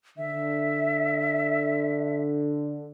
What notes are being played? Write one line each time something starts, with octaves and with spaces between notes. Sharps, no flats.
D3 E5